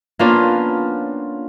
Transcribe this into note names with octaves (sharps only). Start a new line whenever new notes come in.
A#3 B3 C#4 D4 F4